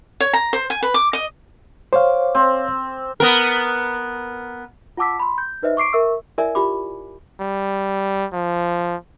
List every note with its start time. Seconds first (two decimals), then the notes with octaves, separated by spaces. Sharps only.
0.20 C#5
0.33 A#5
0.53 C5
0.70 G#5
0.82 B4
0.94 D6
1.13 D#5
1.93 C5 C#5 F5 D6
2.35 C4
3.20 B3 A#4
4.97 F4 F#5 A5 D6 E6 B6
5.20 B5 C6
5.38 G6
5.62 D#4 B4 C5 D#5 E5
5.77 C#6 D6 C7 D7
5.93 A#4 E5 C#6 E6
6.38 E4 A#4 D5 E5 G#5
6.55 F4 G4 B5 D6
7.41 G3
8.33 F3